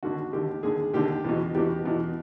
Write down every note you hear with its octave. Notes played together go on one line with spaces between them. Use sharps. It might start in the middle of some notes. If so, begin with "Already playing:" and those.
D#2 D3 F#4
D#2 D3 G4
D#2 D3 G#4
D#2 D3 G4
E2 B2
E2 B2 G4
E2 B2